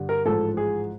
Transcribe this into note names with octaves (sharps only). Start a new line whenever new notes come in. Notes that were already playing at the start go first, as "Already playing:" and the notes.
Already playing: G2 D3
A#4
A1 G#2 F3 A4
G#4